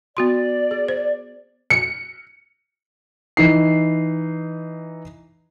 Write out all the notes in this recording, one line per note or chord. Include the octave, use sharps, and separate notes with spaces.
B3 F#4 D5 C6
G#4
C5
C#7
E3 D#4 C7